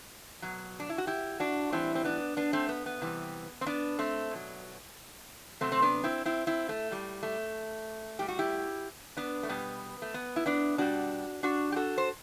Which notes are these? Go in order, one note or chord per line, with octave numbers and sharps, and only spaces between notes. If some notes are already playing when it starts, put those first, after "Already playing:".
B2 F#3
D4
E4
F#4
E4 G4
D4 F#4
A2 E3 G3 C4 E4
C4
B3 D4
B3 D4
A3 C4
B3
B3
C3 E3 G3
C4
B3 D4
A3 C4
B2 F#3
C3 F#3 A3 C4
C4
B3 D4
C4 E4
C4 E4
C4 E4
A3
A2 G3
A3
A2 G3 G4
F#4
E4 G4
B3 D4
A3
B2 G3 B3
A3
B3
E4
B3 D4
B2 G3 D4 F#4
D4 F#4
G4
F#4 A4
C5